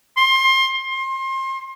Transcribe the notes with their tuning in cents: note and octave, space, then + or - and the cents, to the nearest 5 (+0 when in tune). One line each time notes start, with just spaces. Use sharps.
C6 +25
C6 +30